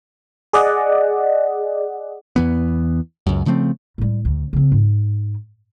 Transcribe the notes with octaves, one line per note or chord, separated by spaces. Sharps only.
G#4 D5 D#5 F#5
E2 E3 B3
C#2 F#2
C#3 F3 A3 C4
A2 G3
D2
C#3 C4
G#2